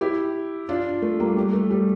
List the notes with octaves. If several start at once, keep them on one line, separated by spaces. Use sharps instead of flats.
E4 G4
D4 F4
A3
G3 A#3
G3
A3
G3